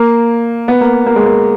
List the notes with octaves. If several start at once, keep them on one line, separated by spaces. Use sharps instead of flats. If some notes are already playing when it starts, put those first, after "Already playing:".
Already playing: A#3
B3
A#3
A#3
G#3
A#3